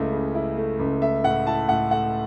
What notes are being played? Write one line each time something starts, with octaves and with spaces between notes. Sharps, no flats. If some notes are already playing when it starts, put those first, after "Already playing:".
Already playing: C#2 C#3 A3 E4
C#3
E4
A3
C#2
A3 E5
A2 F#5
E4 A5
A2 F#5
A3 F#5